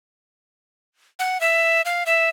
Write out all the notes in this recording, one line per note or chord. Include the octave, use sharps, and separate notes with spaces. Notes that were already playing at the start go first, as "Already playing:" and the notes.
F#5
E5
F5
E5